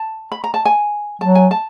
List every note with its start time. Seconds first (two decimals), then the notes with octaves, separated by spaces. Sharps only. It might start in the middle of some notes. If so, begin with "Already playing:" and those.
Already playing: A5
0.32 B5
0.44 A#5
0.54 A5
0.65 G#5
1.21 F#3 A5
1.35 G#5
1.51 A5